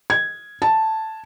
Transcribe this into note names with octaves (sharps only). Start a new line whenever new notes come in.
G#6
A5